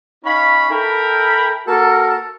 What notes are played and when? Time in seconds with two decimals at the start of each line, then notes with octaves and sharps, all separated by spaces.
0.24 C#4 D#4 C#5 F5 B5
0.70 E4 A4 A#4 G5 B5
1.67 A#3 F#4 A4 A#4